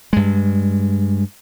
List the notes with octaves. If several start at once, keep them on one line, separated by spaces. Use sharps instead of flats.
G2 G#3